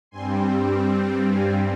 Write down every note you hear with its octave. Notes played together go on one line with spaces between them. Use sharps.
G2 G3 C4 G#5 C6
F5 G#5